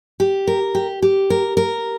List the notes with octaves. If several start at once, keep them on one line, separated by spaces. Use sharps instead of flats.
G4
A#4
G4
G4
A#4
A#4